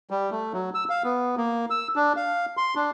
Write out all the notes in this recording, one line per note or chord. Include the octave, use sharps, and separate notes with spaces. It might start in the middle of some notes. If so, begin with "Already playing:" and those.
G3
A3
F#3
E6
F5
B3
A#3
E6
D4
F5
C6
D4